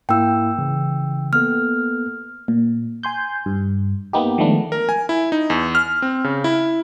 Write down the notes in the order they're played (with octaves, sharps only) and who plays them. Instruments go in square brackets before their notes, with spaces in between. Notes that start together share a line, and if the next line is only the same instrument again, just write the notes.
[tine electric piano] G#2 A#3 E4 [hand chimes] G5 E6
[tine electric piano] C#3 E3
[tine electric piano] A#3 B3 A4 [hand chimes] F6
[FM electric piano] A#2
G#5 C6 G6
G2
A#3 B3 D#4 G4
D#3 F3 G#3 A3 B3 D4
[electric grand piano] A#4
G#5
E4
D#4
E2
F6
C4
C#3
E4